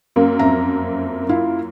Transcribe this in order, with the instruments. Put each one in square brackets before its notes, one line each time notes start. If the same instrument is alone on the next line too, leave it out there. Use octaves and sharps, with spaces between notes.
[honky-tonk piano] F#2 A#3
[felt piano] F2 E5 A#5
E4 F4 F5